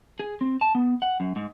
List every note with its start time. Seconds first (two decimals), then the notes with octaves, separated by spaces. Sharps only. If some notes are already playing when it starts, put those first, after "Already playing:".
0.20 G#4
0.41 C4
0.61 A5
0.75 B3
1.02 F#5
1.20 F#2
1.36 G#2